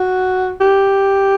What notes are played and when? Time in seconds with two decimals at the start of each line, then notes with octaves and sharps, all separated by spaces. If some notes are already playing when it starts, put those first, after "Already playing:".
Already playing: F#4
0.60 G4